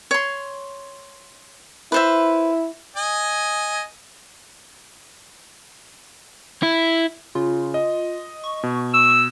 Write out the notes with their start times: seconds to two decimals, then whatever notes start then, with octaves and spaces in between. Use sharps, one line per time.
0.11 C#5 C6
1.92 E4 B4 C5 E5
2.96 D#5 G#5
6.63 E4
7.35 C#3 F4
7.74 D#5
8.44 C#6
8.63 B2
8.94 E6